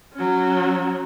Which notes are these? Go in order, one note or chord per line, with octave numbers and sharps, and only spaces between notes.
F#3 C#4